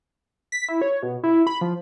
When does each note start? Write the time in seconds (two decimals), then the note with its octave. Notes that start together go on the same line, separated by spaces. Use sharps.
0.52 B6
0.69 E4
0.82 C#5
1.03 B2
1.23 E4
1.47 B5
1.61 F3